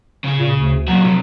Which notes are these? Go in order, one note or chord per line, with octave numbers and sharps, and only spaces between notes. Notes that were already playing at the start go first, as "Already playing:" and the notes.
C#3 G#4
A#2
D2
A#2 F#3 F#4
F2 C3